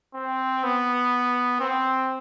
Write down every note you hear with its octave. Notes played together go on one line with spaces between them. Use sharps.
C4
B3
C4